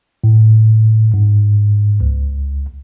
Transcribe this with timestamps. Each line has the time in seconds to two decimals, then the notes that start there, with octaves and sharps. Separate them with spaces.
0.24 A2
1.14 G#2
2.01 C#2